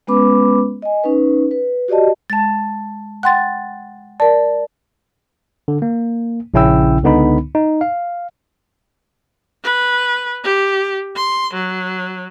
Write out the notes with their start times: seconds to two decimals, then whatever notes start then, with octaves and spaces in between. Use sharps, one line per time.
0.07 G#3 B3 C#4 B4 B5 D6
0.82 D#5 G#5
1.04 C#4 D#4 B4
1.51 B4
1.88 F#4 G4 D5 D#5 A5
2.30 G#3 A5 A6
3.23 F#5 G5 C6 F#6 A6
4.20 A#4 D5 A5
5.68 D3
5.82 A#3
6.54 A#1 C#3 C#4 E4 G5 E6
7.03 C#2 D3 B3 D#4 B5
7.55 D#4
7.81 F5
9.64 B4
10.44 G4
11.16 C6
11.54 F#3